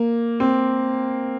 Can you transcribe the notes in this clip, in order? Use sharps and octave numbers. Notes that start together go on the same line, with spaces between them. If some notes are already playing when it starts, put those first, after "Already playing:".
Already playing: A#3
C4